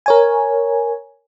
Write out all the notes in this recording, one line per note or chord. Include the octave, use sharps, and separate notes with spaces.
A#4 C#5 G#5